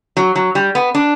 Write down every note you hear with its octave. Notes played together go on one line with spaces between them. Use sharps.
F#3
F#3
G3
B3
D4